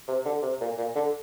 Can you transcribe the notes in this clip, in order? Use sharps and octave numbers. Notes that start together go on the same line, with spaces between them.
C3
D3
C3
A#2
A#2
D3